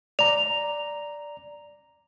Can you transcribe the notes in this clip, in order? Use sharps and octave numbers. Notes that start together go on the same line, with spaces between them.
D5 A#5 F7